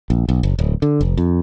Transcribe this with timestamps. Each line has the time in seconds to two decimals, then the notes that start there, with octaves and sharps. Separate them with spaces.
0.10 A#1
0.29 B1
0.43 F#1
0.59 D1
0.82 D3
1.01 F1
1.17 F2